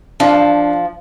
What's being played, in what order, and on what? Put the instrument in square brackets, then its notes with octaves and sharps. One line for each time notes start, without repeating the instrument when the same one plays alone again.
[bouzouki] F3 [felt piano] D4